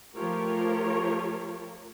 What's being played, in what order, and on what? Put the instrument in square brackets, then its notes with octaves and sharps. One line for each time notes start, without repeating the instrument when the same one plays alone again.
[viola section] F3 A3 F4 G4 A#4 C#5